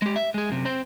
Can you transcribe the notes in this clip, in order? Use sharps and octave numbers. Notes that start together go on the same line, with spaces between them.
G#3 G4
E5
G#3 G#4
F#2 C3
C4 C5